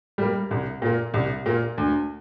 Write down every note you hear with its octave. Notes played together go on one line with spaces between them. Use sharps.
G3 A#3
C2
A#2 A#3
C2
A#2 A#3
D2